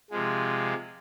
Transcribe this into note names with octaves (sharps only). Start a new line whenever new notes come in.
C3 F3 G#3